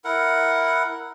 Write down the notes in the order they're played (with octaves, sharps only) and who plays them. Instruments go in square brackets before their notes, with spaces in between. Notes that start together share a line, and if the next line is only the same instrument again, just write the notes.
[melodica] E4 A#4 F#5